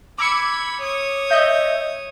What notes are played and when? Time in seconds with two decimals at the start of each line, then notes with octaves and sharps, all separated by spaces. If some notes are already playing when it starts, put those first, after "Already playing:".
0.18 B5 D6 E6 G#6 C#7
0.81 C#5 D#6
1.30 D#5 E5 G6